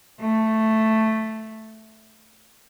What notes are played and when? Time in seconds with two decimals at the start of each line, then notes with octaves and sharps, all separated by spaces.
0.21 A3